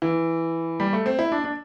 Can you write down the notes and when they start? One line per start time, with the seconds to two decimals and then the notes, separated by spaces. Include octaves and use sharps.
0.02 E3
0.80 G3
0.93 A3
1.06 C4
1.19 E4
1.32 D4
1.44 D4